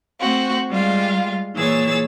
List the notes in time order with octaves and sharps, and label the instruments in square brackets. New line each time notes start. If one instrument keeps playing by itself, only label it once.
[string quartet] A3 C4 F#4
G3 G#3 F4 F5
A#2 E3 G#4 C#5 E6 A6